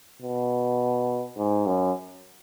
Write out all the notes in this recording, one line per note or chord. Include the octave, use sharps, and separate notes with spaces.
B2
G#2
F#2